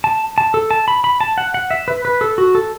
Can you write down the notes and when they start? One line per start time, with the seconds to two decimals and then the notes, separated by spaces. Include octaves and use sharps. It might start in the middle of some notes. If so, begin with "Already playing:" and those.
0.04 A5
0.38 A5
0.54 A4
0.71 A5
0.88 B5
1.04 B5
1.21 A5
1.38 F#5
1.54 F#5
1.71 E5
1.88 B4
2.05 B4
2.21 A4
2.38 F#4
2.55 A4